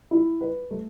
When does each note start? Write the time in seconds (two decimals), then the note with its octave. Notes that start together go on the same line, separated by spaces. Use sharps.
0.11 E4
0.41 B4
0.71 A3